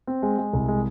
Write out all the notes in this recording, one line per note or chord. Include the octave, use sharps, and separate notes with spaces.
C4
G#3
G#3
C2
G#3